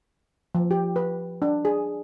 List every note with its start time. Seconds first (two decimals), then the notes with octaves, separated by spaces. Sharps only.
0.55 F3
0.71 G4
0.96 B4
1.42 D4
1.65 G#4